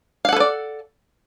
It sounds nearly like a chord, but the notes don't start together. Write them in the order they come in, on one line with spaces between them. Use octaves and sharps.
F5 F#5 A4 B4 D5